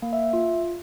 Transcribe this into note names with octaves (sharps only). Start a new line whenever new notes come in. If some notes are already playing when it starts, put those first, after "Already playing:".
A#3
E5
E5
F4